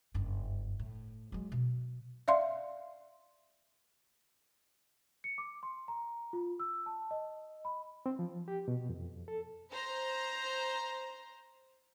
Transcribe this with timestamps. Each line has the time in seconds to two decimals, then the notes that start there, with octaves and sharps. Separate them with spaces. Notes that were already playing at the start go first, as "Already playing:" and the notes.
0.14 F#1 G2
0.79 A2
1.32 F#3 G#3
1.52 B2
2.28 D5 E5 F5 C6
5.24 C#7
5.38 D6
5.63 C6
5.88 A#5
6.33 F4
6.60 E6
6.86 A5
7.11 D#5
7.65 B5
8.06 C4
8.19 F3
8.48 G4
8.68 B2
8.89 F2
9.28 A4
9.71 C5 A#5